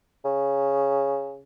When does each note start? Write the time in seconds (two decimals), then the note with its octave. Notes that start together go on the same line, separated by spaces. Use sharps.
0.25 C#3